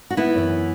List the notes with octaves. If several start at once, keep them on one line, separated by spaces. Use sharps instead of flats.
F#4
B3 E4
F#2 E3